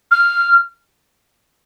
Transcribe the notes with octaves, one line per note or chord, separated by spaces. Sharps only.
F6